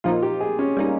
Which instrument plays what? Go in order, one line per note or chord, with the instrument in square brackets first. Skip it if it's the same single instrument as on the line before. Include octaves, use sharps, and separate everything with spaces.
[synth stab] A#2 F3 A#3 D#4 [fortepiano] F4
[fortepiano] G4
G#4
C#4
[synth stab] G3 A#3 D#4